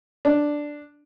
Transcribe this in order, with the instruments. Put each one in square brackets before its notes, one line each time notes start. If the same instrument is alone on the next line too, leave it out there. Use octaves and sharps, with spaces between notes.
[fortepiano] D4